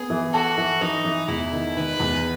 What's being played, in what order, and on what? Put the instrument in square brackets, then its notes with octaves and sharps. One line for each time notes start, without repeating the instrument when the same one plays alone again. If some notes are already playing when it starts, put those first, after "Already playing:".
Already playing: [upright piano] B3 [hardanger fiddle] G#4
[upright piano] E3
[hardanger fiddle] F#4 [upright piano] A4
[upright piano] E3
[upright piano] E3 [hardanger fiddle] D#4
[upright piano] E3
[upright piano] E2 [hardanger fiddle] E4
[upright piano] D#3
[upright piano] D#3 [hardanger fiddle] B4
[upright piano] E2